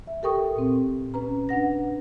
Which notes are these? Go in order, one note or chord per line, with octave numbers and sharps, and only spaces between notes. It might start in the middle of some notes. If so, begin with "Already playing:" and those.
E5
G4 A4 A#4 G5 C#6 D#6
A#2 C4
C#4 B4 A#5
D4 B4 F#5 A#6